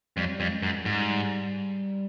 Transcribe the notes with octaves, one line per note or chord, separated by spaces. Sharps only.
F2 G3
F#3
G3
F2
G#3
F#2
G3
G#2
G3